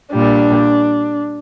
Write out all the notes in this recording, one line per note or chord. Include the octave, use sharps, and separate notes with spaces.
A#2 G3 D4